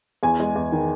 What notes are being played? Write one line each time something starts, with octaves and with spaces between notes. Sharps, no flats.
E2 G#5
G#3
E2
D#3